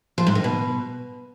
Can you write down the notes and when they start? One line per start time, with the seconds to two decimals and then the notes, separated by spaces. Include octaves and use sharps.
0.18 F3
0.27 G#2
0.35 D#3
0.44 B2